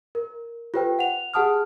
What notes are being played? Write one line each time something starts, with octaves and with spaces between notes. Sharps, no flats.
A#4
F4 G4 A4 B4 C5 G5
F#5 F7
G4 G#4 F#5 A5 D#6 F6